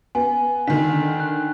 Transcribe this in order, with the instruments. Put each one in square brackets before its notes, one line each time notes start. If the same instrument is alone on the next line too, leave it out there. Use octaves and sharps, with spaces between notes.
[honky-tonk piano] B3 [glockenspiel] G#5
[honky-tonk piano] D3 D#3 [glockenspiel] B6
[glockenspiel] F#6